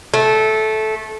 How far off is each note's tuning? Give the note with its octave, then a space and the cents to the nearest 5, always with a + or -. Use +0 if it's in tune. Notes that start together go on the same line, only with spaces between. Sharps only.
A3 -15